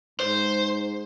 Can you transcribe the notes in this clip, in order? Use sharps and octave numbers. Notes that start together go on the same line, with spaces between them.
G#2 C5